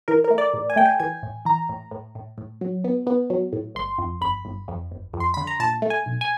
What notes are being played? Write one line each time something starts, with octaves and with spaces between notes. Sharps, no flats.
E3 A#4
A#4
A3
D5
A2
G#5
A3 G5
G#5
E3 G#5
A2
E3 A#5
A2
A2
A2
A2
F#3
B3
B3
F#3
A2
G1 C6
F2
G1 B5
G1
F2
G1
F2
C6
D3 B5
A#5
A#2 A5
A3
G#5
B1
G#5